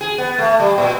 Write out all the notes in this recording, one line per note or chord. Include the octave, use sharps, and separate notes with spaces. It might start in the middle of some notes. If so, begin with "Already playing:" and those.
G#4
B3
A3
G3
A#2